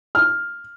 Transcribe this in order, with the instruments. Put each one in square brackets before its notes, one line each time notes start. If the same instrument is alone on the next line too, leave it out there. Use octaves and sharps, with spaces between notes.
[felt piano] F6